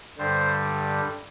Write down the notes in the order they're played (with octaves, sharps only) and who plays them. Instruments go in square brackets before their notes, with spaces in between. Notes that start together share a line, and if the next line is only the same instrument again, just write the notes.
[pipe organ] G2 D3 G3 C5